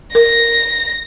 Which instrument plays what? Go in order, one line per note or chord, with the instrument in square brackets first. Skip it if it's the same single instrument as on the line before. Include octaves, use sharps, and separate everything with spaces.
[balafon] A#4 [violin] A#6